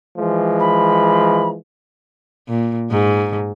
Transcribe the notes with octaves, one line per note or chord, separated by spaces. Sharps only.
E3 F3 G#3
B5
A#2
G#2